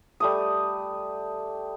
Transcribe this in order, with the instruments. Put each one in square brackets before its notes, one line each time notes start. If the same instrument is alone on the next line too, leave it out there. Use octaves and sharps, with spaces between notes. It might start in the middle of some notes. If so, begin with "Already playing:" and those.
[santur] G3 A3 D#6